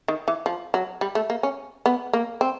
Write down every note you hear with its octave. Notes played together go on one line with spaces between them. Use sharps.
D#3
E3
F3
F#3
G3
A3
A#3
C#4
B3
A#3
C4